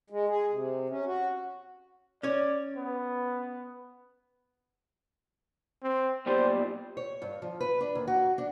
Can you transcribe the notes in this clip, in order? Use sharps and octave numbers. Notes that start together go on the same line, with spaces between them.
G#3
G#4
C3
C#4
F#4
C#4 C#5 D5
B3
C4
B1 A#2 G3 C5
C#5
G2
F3
B4
D4
D#2
F#4
D4